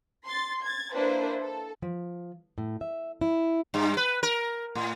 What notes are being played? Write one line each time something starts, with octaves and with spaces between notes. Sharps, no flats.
C6 A6
G#6 A6
A#3 D4 E4 B4 C5
A4
F3
A2
E5
E4
G2
B4
A#4
A2